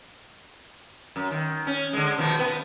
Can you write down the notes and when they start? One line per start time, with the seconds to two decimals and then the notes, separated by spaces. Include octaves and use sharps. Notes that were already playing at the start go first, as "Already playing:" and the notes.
1.16 F#2
1.31 D#3
1.67 C#4
1.93 D3 G#3
2.18 B2 D#3 F3
2.39 B3 B4